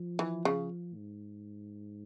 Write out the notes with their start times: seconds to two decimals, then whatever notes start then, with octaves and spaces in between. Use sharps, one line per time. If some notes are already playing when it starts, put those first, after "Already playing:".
Already playing: F3
0.19 E3
0.45 C#3
0.96 G#2